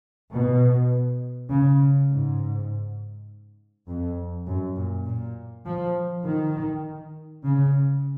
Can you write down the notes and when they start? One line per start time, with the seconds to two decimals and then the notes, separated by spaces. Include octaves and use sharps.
0.32 B2
1.50 C#3
2.10 G#2
3.87 F2
4.47 F#2
4.76 A#2
5.06 A#2
5.66 F3
6.25 D#3
7.44 C#3